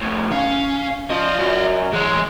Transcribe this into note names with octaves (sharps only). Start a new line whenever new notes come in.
F2 A2
C#4 F5
F3 D5 D#5
F#2
E3 G#3 C#5